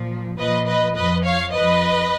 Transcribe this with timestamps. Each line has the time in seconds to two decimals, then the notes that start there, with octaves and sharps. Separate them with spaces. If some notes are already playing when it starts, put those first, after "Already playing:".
Already playing: A#2 F3
0.37 A#2 F3 B4 D#5
0.66 B4 D#5
0.95 F2 F3 B4 D#5
1.24 C#5 F5
1.52 F2 F3 B4 D#5